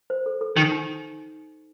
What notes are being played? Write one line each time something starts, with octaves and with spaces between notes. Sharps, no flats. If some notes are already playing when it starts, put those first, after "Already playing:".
C5
A4
A4
D#3 D#4
D#4